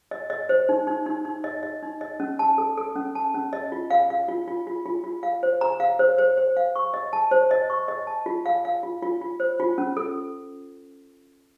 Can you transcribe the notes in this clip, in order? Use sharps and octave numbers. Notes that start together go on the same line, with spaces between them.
D#5
D#5
C5
D#4
D#4
D#4
D#4
D#5
D#5
D#4
D#5
C#4
A5
A4
A4
C#4
A5
C#4
D#5
F4
F5
F5
F4
F4
F4
F4
F4
F5
C5
A#5
F5
C5
C5
C5
F5
C#6
D#5
A5
C5
D#5
C#6
D#5
A5
F4
F5
F5
F4
F4
F4
C5
F4
C#4
A4